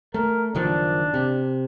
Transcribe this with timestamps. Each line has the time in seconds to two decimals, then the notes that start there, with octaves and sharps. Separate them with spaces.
0.14 A3 A#4
0.55 F#1 D#3 F3 D4
1.14 C3